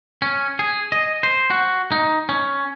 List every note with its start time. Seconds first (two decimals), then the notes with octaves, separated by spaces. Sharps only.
0.22 C#4
0.59 G#4
0.92 D#5
1.23 C5
1.50 F#4
1.92 D#4
2.29 C#4